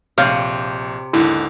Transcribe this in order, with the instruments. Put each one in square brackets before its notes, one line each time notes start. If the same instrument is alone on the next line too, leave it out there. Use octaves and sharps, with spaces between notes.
[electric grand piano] A#1 C#5 G6 [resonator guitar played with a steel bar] C3 [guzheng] F5
[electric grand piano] D#2 G#2 D3 [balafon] E4